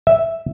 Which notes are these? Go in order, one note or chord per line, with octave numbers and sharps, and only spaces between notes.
E5